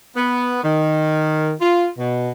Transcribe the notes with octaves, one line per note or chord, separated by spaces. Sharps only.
B3
D#3
F4
B2